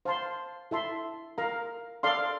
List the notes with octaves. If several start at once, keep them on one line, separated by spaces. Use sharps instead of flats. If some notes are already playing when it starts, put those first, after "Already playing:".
C5 F5 A5 C6
E4 A4 E5 A5 C6
A#4 F5 A#5
A4 D5 F5 C6